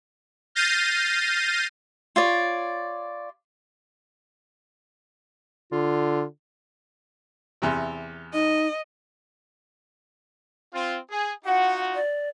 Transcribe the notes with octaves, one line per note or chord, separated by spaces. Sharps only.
F6 G6 A6 A#6 C7 D#7
F4 C#5 D5
D3 F4
E2 C3
D#4 D#5
C4 F4
G#4
D#4 F4 F#4 F#5
D5